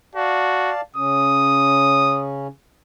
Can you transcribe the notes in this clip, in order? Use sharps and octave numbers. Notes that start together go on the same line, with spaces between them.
F#4 D5 F5 A5
C#3 C#4 D#6